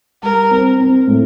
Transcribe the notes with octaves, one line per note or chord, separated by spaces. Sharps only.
G3 A#4
C4
C4
A2